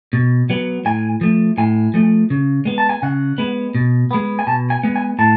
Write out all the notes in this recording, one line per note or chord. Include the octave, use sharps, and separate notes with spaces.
B2
F#3 B3
A2 G#5
F3 A3
A2 G#5
F3 A3
C#3
G#3 B3
A5
G#5
C#3 F#5
G#3 B3
B2
G#3 B3
G#5
B2 A5
G#5
G#3 B3
G#5
A2 A5